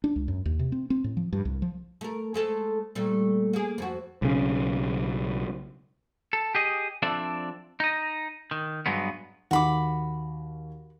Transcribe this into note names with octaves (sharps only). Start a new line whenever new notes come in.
D4
C#2
F#2
D#2
C3
C4
C4
A2
F3
G2
C2
F3
A3 A#4
G#3 A3 A4
A#2 G3 A3
A#3 G#4
F2 F#4
B1 C#3
A4
G4 G#4 D#5
F3 C4 D4 A4 D5 E5
D#4 D#5
D#3
G2 F#3 G#3 B3
D#2 F#4 B5 D6